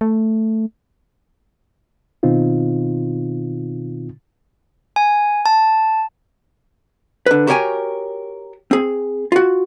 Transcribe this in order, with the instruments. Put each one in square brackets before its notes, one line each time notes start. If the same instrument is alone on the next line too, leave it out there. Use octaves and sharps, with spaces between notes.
[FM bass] A3
[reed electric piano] B2 D#3 C4 D#4 F4
[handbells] G#5
A5
[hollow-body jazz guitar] D3 B4
F#4 G4 A#4 C#5 G5 G#5
C4 G#4
F4 F#4